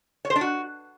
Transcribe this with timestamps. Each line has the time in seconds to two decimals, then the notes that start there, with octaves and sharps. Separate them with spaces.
0.25 C#5
0.30 C5
0.36 D4
0.41 F#4